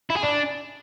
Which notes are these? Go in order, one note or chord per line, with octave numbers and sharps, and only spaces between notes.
E4
G#4
D4